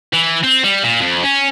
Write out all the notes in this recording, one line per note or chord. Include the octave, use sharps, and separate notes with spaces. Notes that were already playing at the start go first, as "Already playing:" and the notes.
E3
C4
G3
A#2
F2
C#4